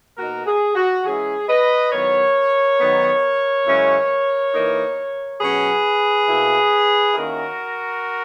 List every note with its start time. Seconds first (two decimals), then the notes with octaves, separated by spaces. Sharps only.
0.17 B2 A#3 D#4 F#4 A#4
0.46 G#4
0.75 F#4
1.05 E3 G#3 C#4 E4 G#4
1.48 B4 D#5
1.92 D#3 F#3 B3 E4 A#4 C#5
2.79 D#3 F#3 B3 D#4
3.66 F#2 C#3 G#3 C#4 E4
4.52 E3 A#3 D#4
5.40 B2 F#3 C#4 G#4 B4
6.27 B2 A#3 E4
7.13 D#3 A#3 C#4 E4 F#4 A#4